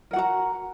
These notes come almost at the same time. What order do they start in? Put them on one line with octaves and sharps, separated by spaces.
A#4 F#5 F#4 A#5